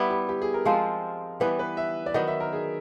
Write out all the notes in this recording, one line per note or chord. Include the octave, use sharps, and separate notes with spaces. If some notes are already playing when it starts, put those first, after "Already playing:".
Already playing: G3 B3 E4
G4
G4
G#4
A#4
F3 G#3 C4 F4
E3 G3 B3 B4
B4
E5
D5
D#3 F#3 B3 D#5
E5
A#4
G#4